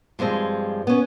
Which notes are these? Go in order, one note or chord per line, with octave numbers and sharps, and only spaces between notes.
G2 F3 G#3 C4
B3 C#4